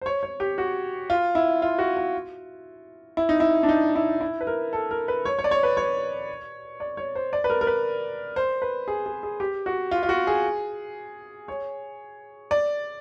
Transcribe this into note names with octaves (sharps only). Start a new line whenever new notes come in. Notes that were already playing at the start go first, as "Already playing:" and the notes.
C5
C#5
C#5
G4
F#4
F4
E4
F4
F#4
F#4
E4
D#4
E4
D4
D#4
E4
E4
B4
A#4
A4
A#4
B4
C#5
C#5
D5
C#5
B4
C#5
D5
C#5
C5
D5
B4
A#4
A#4
B4
C5
B4
G#4
G#4
G#4
G4
F#4
F4
F4
F#4
G#4
C#5
D5